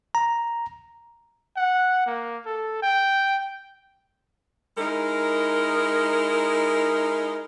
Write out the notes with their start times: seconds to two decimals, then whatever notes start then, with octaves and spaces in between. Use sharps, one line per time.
0.15 A#5
1.56 F#5
2.06 A#3
2.46 A4
2.82 G5
4.77 G#3 D#4 E4 A#4